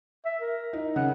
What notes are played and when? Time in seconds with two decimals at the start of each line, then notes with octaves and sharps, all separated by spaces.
0.25 E5
0.41 A#4
0.73 D#4
0.96 C#3 F#5